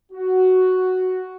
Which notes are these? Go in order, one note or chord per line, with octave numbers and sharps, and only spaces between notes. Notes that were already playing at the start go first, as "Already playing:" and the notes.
F#4